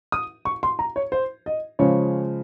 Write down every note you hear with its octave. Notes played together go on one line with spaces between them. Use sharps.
D#6
C#6
C6
A#5
C#5
C5
D#5
C#3 F3 G#3 C#5